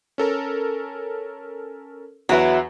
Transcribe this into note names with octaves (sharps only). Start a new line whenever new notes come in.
C#4 A4 A#4
E2 F#3 E4 F#4 B4